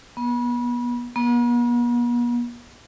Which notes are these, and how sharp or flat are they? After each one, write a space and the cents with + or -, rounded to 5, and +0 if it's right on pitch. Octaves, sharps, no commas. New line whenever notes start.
B3 -30
B3 -45